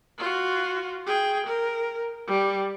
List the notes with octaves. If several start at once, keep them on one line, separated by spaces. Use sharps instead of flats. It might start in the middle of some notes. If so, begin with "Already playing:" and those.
F4 F#4
G#4 G5
A#4
G3